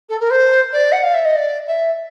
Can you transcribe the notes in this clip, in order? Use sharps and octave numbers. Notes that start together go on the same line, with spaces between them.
A4
A#4
C5
D5
F#5
F5
E5
D#5
D5
E5